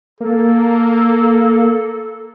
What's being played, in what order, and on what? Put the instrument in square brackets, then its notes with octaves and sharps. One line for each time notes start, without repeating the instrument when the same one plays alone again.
[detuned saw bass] A#3 [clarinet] A4